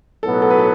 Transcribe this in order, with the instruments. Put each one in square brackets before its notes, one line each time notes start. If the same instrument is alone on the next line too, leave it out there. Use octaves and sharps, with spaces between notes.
[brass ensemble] B1 A2 F#3 B3 [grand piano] A4
[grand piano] A4
B4
A4